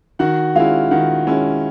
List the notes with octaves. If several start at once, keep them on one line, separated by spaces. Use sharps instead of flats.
D#3 F#4 F#5
G#3 C#4 E4 F4 F5
D#3 F#4 F#5
G#3 C#4 E4